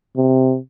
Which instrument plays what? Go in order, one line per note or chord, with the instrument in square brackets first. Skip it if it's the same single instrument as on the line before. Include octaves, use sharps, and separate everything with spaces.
[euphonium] C3